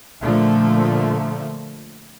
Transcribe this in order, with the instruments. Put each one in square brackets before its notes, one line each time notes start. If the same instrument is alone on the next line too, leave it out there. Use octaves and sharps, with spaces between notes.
[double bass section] A#2 D3 F3 A3